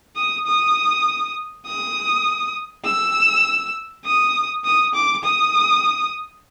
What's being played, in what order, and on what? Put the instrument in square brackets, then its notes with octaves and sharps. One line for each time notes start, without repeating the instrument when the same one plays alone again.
[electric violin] D#6
D#6
D#6
E6
D#6
D#6
D6
D#6